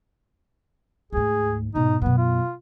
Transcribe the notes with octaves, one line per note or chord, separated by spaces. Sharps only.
D2 G#2 G#4
G#2 B2 D#4
F#2 B2 B3
F4